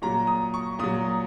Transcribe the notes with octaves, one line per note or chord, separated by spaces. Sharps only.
A#2 F#3 A#5
D#6
C#6
A#2 F#3 D#6